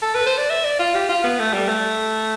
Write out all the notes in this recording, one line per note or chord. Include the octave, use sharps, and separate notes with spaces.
A4
B4
C5
D5
E5
D5
F4
G4
F4
B3
A3
G3
A3